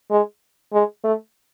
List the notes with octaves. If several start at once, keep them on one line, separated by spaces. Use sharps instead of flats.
G#3
G#3
A3